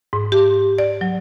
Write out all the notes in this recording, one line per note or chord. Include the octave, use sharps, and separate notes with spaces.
G#2
G4
D5
F#3